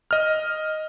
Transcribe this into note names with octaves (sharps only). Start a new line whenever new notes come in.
D#5 F6